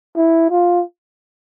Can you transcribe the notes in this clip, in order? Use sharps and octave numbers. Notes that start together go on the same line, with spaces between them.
E4
F4